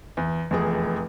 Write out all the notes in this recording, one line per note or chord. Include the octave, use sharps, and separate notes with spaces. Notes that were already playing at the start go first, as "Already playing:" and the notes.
E2
F1 E2 G#4